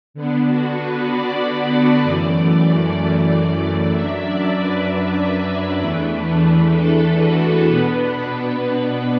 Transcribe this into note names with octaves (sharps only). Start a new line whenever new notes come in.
D3 B3 D4
F#4
B4
D5
F#2 E3 A3
F#2 F#3 D4 E5
D5
B4
E2 E3 A3 D4
A4
F#4
B2 B3 D4 B4